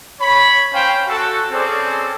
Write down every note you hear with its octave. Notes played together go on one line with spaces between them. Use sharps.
C#5 B5
C#4 C5 F5 G5
F#4 A4
C4 C#4 G#4 A4 C5 D5